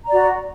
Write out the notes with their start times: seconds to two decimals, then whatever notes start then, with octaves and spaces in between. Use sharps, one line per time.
0.04 A#5
0.08 D5
0.12 F#4